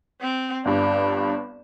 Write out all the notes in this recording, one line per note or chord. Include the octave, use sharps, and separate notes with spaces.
C4
G1 G2 D4